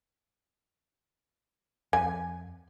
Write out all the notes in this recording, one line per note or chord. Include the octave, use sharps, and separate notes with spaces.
F2 G#5